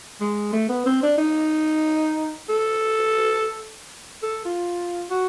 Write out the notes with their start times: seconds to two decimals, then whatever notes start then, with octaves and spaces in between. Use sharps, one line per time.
0.21 G#3
0.52 A3
0.69 B3
0.86 C4
1.03 D4
1.18 D#4
2.49 A4
4.23 A4
4.45 F4
5.10 F#4